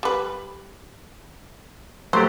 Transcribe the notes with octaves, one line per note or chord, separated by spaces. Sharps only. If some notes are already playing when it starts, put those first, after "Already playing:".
G3 B4
F#3 A3 G4 C5